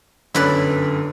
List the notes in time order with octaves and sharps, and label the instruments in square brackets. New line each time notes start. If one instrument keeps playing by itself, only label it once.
[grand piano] G1 F#2 [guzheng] E4 B4 D5